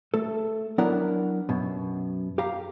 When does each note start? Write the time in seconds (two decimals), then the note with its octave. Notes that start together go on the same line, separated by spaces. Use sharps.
0.14 A3 A4
0.78 F#3 B3 D4 E4 A#4 F#5
1.49 F#2 B2
2.38 G4 F5 A#5